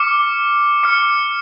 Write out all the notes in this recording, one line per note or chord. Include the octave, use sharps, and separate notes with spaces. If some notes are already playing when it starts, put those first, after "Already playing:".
Already playing: D6 F6 C#7
D6 F6 C#7